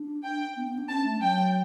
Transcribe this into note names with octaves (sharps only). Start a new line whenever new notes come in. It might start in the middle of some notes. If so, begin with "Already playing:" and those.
Already playing: D4
G5
B3
B3
D4
C#4 A5
A3
F#3 G5